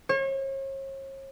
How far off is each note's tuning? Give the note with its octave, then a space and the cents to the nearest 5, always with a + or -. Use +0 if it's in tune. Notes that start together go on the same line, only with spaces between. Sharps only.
C#5 -40